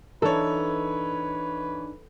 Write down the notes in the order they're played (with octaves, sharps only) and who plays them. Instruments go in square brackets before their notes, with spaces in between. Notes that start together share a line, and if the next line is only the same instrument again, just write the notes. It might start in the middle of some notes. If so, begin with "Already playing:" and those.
[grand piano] E3 C#5 [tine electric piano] D4 D#4 [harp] A4 [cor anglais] B4